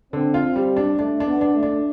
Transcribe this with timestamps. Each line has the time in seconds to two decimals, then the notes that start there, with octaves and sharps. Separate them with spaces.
0.13 D3 C4
0.34 F4
0.56 G3
0.77 D4
0.98 A3 D4
1.20 D4
1.26 B3
1.41 D4
1.55 A3
1.63 D4